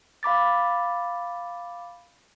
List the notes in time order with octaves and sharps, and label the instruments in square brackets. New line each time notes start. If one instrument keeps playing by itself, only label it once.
[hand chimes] F5 B5 D6 A6